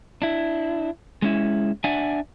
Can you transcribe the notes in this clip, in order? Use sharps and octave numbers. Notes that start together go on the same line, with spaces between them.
D4 E4
G#3 C#4 E4
D4 D5 E5 F#5 G#5